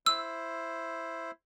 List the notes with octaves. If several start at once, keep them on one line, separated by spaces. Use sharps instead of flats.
E4 C5 E6